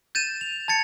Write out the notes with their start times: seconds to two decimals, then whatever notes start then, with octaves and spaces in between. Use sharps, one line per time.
0.15 G6 A6 D#7 E7
0.41 F7
0.68 A5 G#6 A6 C#7